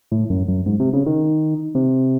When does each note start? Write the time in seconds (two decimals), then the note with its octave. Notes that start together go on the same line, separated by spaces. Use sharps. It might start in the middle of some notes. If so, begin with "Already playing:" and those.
0.12 A2
0.30 F#2
0.48 F#2
0.66 G#2
0.80 C3
0.93 C#3
1.06 D#3
1.75 C3